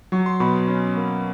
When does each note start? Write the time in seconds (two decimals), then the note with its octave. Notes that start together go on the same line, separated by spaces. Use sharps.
0.12 F#3 C#6
0.26 C6
0.40 B2 B5 C#6
0.68 C#4
0.97 A#3